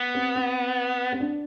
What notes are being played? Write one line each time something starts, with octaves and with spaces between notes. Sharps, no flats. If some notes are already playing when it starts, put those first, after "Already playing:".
Already playing: B3
C4
C4
C4
D4